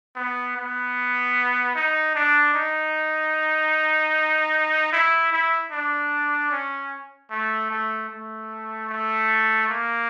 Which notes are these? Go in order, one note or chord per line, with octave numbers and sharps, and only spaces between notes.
B3
B3
D#4
D4
D#4
E4
E4
D4
C#4
A3
A3
A3
A3
A#3